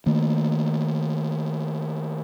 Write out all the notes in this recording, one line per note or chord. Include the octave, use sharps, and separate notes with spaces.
D#3 A3 A#3